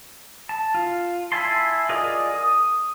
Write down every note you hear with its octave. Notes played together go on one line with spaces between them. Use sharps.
A5
F4
E4 E5 G#5 A5 C6
F4 G#4 A#4 D5 D#5
D#6